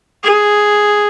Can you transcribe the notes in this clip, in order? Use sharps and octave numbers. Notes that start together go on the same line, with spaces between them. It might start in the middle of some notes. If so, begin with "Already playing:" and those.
G#4